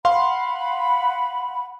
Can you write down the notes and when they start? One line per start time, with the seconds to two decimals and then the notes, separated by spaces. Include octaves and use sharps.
0.05 F5 F#5 B5 C6